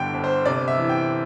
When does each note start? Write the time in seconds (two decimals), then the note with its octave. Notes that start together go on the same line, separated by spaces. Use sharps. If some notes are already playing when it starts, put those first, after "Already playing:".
Already playing: G1 G2 D3 G5
0.14 G1
0.24 C5
0.45 C3 D5
0.68 E5
0.78 E3
0.89 G5